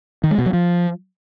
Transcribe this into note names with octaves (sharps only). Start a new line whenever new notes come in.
D#3
G#3
B2
F#3
F3